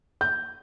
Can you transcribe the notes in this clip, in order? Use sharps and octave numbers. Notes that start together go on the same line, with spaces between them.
G6